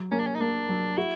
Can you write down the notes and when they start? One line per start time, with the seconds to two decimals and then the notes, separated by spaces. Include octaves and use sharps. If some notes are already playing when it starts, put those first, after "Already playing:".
Already playing: F#3
0.12 A#3 C#4
0.19 D4
0.26 C#4
0.35 D#4
0.40 A#3 D4
0.69 F#3
0.97 E4 F#4